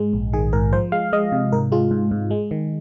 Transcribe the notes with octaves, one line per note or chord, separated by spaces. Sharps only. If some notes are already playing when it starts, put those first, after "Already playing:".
Already playing: G#2 G#3
A#1
D#3 G#4
G#2 A#4
F3 C5
G#3 F5
G#3 D#5
C3
G#2 A#4
G#3 F4
G#2
G#2
G#3
D#3